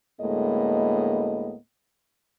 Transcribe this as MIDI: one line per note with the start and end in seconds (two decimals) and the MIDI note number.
0.21 1.55 38
0.21 1.55 45
0.21 1.55 56
0.21 1.55 58
0.21 1.55 59
0.21 1.55 75